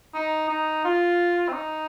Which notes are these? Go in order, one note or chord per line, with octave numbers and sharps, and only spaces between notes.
D#4
D#4
F4
C4
D#4